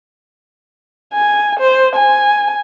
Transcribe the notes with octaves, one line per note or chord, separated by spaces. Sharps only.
G#5
C5
G#5